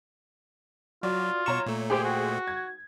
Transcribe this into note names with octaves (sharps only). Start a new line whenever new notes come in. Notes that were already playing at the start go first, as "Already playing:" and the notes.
F#3 F4 F#4 D5
B2 C#5 A#5 C#6 E7
A#2 A3
G4 G#4 C5 G5
F#4
G#6